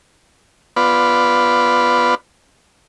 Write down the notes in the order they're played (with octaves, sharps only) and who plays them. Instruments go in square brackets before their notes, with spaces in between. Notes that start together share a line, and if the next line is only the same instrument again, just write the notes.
[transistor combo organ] B3 F4 B4 D5